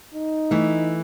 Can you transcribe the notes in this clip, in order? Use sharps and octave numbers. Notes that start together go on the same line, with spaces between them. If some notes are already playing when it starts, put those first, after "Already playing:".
D#4
E3 A3